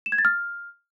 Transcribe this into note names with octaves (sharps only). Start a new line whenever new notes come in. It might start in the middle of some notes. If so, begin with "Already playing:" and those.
E7
G#6
A6
F6